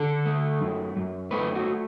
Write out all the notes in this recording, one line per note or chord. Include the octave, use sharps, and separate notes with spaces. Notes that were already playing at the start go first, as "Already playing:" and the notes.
Already playing: D3 A4
A3
F#2
F#2
A3 B4
F#4